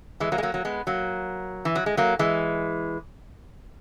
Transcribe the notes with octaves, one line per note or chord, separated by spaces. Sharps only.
E3 G#3
F#3 A#3
G#3
F#3 A#3
F#3 A#3
G#3 B3
F#3 A#3
E3
F#3
G#3
F#3 A#3
E3 G#3